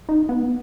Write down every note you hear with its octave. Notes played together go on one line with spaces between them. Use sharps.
D#4
B3